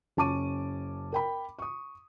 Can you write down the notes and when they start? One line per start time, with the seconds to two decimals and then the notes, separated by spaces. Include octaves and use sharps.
0.17 F#1 C#4 A5 C#6 D6 D#7
1.12 A#4 G5 B5
1.59 C#6 D#6